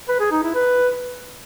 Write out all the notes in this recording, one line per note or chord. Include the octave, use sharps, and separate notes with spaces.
B4
G#4
D#4
E4
B4